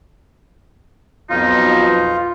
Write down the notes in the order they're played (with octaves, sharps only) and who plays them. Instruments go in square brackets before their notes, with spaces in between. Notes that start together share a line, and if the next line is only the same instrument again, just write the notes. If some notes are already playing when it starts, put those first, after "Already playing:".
[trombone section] B1 F2 B2 [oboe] D#4 [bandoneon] F4